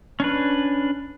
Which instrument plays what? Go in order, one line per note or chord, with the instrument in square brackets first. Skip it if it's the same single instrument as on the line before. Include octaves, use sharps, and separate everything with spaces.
[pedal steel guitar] C#4 D4 B4